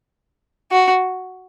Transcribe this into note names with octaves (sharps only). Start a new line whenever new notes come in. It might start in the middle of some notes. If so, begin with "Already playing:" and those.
F#4